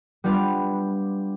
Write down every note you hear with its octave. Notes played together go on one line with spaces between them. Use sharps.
G3 B3 D4 F4